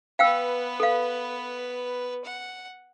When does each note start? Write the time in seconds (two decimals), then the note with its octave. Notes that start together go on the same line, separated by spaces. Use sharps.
0.19 B3 B4 F5 G5 E6
0.80 A4 F5
2.24 F#5